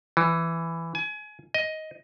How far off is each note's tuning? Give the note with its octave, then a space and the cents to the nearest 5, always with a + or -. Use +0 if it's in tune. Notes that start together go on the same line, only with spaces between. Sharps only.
E3 +10
G#5 +25
D#5 +10